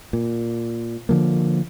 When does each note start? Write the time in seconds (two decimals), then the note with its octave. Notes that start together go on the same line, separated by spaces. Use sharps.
0.13 A#2
1.09 D3 F3 A#3